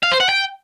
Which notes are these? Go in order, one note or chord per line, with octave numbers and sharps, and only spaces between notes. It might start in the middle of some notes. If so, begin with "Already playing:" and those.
F5
C5
F#5
G5